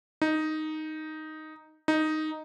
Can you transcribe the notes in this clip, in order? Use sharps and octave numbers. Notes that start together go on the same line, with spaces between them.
D#4
D#4